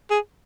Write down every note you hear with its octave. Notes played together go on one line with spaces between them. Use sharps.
G#4